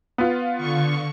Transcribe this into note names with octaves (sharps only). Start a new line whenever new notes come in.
B3 F4
D3 C#6